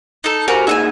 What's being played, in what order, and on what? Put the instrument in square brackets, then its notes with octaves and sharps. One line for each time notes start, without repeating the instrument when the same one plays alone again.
[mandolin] D#4 A4
[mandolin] F#4 A#4 [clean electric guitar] G4 C5 G#5
[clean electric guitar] A#2 D#4 G#4 [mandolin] E5 F#5 G#5